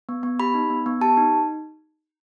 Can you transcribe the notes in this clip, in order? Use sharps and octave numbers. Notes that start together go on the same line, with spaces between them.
B3
B3
G4 B5
D#4
B3
B3
G4 A5
D#4